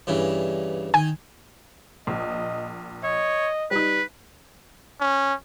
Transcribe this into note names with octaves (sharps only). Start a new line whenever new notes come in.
G2 C#3 E3
D#3 G#5
A#1 D#5
C#5 D#5
G3 D#4 B4
C#4